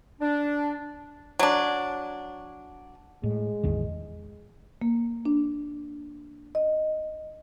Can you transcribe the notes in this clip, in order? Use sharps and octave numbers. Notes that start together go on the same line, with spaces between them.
D4
F#3 D4
A2 G#3
A1 E2 D#3
A#3
D4
D#5